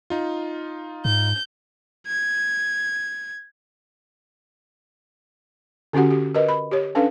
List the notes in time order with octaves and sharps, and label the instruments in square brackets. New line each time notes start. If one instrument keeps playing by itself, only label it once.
[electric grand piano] D#4 F4
[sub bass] G#2 [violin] G6
[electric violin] G#6
[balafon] D3 C#4 F#4 G4 F#5
G4
A#4 B4 D#5
B5
G4 C#5
C#4 D4 A4 B4 F5